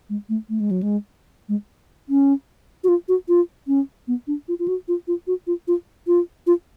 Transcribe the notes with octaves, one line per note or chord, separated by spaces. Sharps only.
G#3
A3
A3
G#3
F#3
G#3
G#3
C#4
F#4
F4
F#4
F4
C#4
B3
D4
F4
F4
F#4
F4
F4
F#4
F4
F4
F4
F4